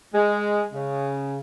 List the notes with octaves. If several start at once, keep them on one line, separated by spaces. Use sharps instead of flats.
G#3
C#3